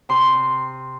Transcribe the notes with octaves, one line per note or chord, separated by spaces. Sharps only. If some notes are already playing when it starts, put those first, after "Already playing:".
C3 C6